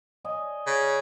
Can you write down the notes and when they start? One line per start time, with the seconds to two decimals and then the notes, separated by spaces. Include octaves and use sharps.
0.24 D5 D#5 G#5
0.67 C#3